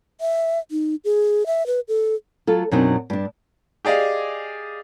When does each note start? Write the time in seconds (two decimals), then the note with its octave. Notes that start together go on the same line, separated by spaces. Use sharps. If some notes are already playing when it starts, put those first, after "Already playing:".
0.21 E5
0.71 D#4
1.04 G#4
1.46 E5
1.67 B4
1.88 A4
2.47 F#3 F4 A4
2.71 F#2 B2 F#3 C4 D4 D#4
3.10 G2 D4
3.85 G4 G#4 D5 D#5 F5